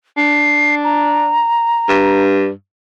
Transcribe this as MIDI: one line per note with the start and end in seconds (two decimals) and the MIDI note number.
0.17 1.44 62
0.17 0.75 96
0.84 2.21 82
1.89 2.50 43